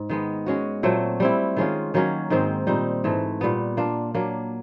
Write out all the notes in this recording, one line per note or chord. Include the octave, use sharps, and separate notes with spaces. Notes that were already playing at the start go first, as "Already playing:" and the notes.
Already playing: G#2
D#3 G#3 B3
G#3 C#4 F#4
A#2 F#3 A3 C4
G3 C4 E4
D#3 G#3 C#4 F4
D#3 F#3 A#3 C#4
G#2 D#3 G#3 C4
A#2 G3 C4 D#4
G#2 E3 A3
A#2 G3 B3
A#3 D4 F4
F#3 A#3 D4